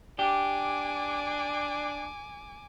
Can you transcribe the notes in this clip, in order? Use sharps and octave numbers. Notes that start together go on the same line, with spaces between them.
D4 G4 G#5 D6